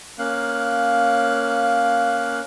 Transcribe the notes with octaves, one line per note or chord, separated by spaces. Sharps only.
A#3 C#4 F5 F#6